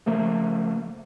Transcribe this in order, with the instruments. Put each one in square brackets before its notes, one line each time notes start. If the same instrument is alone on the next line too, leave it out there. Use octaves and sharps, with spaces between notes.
[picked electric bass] C#3 F3 A3 A#3